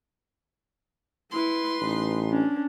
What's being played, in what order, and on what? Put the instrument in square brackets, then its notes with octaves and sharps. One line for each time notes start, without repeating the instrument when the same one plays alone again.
[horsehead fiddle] E4 [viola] B4 C6
[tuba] A1 [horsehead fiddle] D#4
[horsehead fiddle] C#4 D4